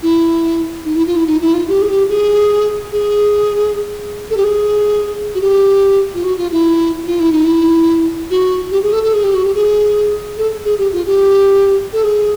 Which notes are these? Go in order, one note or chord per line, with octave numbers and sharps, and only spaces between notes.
E4
D#4
E4
F4
E4
D#4
E4
F4
G4
G#4
G4
G#4
G#4
A4
G4
G#4
F#4
G4
F4
F#4
F4
E4
F4
E4
D#4
E4
F#4
G4
G#4
A4
A4
G#4
G4
F#4
G4
G#4
A4
G#4
G4
F4
G4
A4
G#4